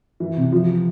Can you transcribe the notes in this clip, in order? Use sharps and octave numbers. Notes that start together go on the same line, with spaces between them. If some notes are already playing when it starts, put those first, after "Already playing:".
E3
C3
F3